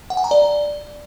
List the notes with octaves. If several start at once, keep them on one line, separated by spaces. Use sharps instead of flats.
F#5
G#5
A#5
D5